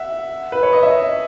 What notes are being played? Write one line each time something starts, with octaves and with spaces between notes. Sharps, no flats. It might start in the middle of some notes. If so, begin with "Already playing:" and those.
Already playing: E5 F#5
B4
C#5
D#5
E5